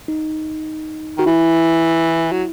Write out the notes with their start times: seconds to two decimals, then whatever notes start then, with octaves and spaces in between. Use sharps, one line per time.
0.08 D#4
1.18 D#3 F#4
1.26 E3 E4
2.32 F#3